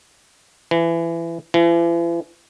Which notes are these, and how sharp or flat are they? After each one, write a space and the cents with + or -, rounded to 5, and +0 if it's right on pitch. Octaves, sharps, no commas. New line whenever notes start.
E3 +25
E3 +45